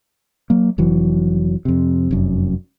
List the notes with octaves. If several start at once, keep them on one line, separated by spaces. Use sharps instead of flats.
F#3 A#3
F1 E3 F#3
F2 C3
F1 F#2